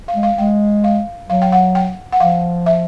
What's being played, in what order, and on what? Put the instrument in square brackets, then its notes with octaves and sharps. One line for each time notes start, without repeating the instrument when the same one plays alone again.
[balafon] F5
[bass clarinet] G#3
[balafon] F5
[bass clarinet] G#3 [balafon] G5
[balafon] F5
[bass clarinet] F#3 [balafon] F5
[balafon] G5
F#5
G5
F#5
[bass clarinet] F3 [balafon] F5
[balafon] E5